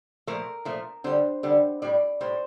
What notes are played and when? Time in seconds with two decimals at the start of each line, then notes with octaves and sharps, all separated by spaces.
0.27 A#2 F3 A3 A#4
0.65 A#2 F3 A3
1.04 D3 G3 C5
1.43 D3 G3
1.82 A2 G3 D5
2.21 A2 G3 C5